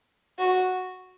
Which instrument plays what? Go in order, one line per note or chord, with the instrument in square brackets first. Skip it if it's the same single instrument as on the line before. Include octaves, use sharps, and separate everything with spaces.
[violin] F#4